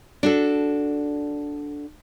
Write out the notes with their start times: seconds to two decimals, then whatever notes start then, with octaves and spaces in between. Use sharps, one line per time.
0.23 D4 F#4 A4